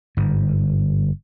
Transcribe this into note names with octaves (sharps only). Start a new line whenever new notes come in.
G1 G#2